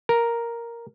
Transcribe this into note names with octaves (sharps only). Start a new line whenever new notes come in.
A#4